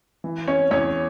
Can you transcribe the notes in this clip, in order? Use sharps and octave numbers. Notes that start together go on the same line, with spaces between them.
E3
C#4 C#5
E2 C#4 C#5